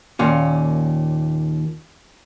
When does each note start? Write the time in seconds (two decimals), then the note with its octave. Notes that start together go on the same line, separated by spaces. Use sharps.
0.19 D#2 A#2 C#4